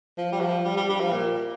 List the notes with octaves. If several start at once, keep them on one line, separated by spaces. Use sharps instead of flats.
F3
G3
F3
G3
G3
G3
F3
A#2